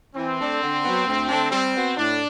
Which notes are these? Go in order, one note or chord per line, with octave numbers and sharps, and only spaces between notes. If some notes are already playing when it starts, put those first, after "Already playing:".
E3 C4
A3 D4 A4 D5
D3
F#3 B3
D2
D3 A3 D4
G3 C4
B3 F#4 C5
A2 D4